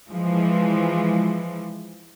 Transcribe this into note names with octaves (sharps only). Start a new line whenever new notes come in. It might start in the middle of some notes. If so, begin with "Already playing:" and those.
E3 F3 G#3